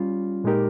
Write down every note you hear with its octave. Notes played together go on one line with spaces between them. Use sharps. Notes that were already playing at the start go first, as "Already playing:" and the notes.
Already playing: G3 C#4 F4
A#2 G#3 D#4 G4 A#4